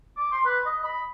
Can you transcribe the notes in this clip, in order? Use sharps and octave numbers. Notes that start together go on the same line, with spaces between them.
D6
C6
B4
D#5
B5